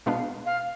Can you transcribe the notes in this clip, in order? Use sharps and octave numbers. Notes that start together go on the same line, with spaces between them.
B2 G#3 B3 D4 F5
F5